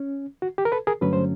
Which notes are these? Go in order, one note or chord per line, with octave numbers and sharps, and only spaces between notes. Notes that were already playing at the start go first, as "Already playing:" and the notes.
Already playing: C#4
F#4
G4
A#4
A4 B4
G#4 A#4
G2 D3 F#3 A3 C#4 B4
C5